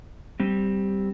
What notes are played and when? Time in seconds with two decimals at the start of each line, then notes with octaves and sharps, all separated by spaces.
0.40 G3 C4